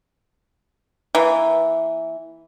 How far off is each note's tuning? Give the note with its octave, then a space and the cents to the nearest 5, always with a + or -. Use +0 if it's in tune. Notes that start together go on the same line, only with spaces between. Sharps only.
E3 -5 A#3 +0